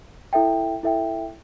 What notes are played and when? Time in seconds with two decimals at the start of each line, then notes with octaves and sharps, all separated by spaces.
0.33 E4 A4 E5 G5
0.83 E4 A4 E5 G5